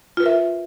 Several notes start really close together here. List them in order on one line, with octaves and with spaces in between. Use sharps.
F4 B4 A#4 E5